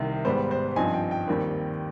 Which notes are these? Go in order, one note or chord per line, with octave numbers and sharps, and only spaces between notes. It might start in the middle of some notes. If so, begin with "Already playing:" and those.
Already playing: C2 C3 D#3
G#2 G3 B3 C5
C5
G2 F3 C4 D#4 G#5
G5
G5
D#2 D#3 G3 C4